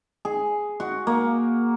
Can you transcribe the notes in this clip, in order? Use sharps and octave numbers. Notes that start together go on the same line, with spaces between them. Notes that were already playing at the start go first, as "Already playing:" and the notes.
G#4
F#4
A#3